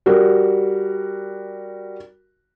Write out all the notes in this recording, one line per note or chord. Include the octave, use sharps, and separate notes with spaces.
G3 F#4 A#4